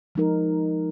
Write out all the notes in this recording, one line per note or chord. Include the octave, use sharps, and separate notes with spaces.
F3 G#3 D#4 A#4